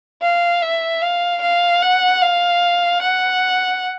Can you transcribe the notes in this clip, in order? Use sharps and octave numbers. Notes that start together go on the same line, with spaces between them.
F5
E5
F5
F5
F#5
F5
F#5